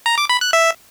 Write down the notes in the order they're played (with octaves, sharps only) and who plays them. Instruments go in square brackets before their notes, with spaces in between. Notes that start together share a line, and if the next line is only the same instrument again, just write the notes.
[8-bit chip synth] A#5
D6
B5
F#6
E5